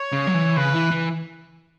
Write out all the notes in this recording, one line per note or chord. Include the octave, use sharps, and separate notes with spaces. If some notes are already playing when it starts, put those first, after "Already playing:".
Already playing: C#5
C#3
F#3
E3
C#3 B4
E3
E3